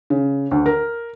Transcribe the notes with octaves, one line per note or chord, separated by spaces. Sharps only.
C#3
D2
A#4